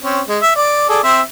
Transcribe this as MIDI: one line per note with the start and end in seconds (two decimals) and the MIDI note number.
0.01 0.22 60
0.01 0.22 61
0.28 0.39 56
0.42 0.52 76
0.56 0.88 74
0.89 0.99 68
0.89 0.99 69
0.89 0.99 74
1.04 1.21 60
1.04 1.21 76